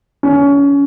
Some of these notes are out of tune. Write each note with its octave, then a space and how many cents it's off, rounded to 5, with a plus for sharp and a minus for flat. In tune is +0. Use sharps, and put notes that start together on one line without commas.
C#4 +25